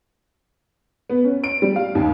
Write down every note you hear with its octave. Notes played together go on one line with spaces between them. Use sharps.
B3
C#4
D7
G3
F5
D#2